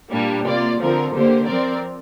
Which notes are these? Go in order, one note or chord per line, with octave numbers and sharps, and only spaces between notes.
A#2 G3 A#3 D4
C3 A#3 F4 D5
D3 F3 C4 A#4
D3 A#3 G4 C5
F3 C4 A#4 D5